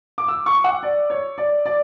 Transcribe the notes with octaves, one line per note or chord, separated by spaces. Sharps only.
D6
E6
C#6
F#5
D5
C#5
D5
D5